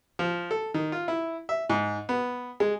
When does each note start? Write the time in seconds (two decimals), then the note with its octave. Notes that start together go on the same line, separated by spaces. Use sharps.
0.19 F3
0.51 A4
0.74 D#3
0.92 F4
1.08 E4
1.49 E5
1.70 G#2
2.09 B3
2.60 G#3